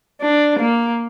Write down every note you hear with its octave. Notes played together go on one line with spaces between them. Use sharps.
D4
A#3